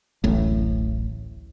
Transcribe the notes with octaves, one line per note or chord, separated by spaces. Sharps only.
D1 A1 A2